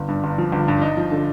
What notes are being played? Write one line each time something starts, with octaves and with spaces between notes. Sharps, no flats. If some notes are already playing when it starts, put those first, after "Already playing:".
Already playing: G1
G2
G1
F3
G1
G2
D#4
F3
D3